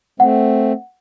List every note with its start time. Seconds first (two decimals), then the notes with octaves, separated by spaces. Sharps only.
0.20 A3 C4 F#5